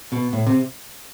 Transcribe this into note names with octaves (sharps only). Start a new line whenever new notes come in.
B2
A2
C3